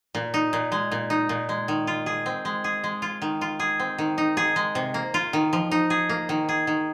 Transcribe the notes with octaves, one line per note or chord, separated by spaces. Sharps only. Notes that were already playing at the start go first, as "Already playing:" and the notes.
A#2
D#4
A#2
G#3
A#2
D#4
A#2
G#3
D#3
F4
G#4
C4
G#3
G#4
G#3
F4
D#3
F4
G#4
C4
D#3
D#4
G#4
G#3
C3
A#3
F4
D#3
F3
D#4
G#4
A#3
D#3
G#4
D#3